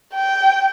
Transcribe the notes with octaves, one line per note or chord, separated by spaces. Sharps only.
G5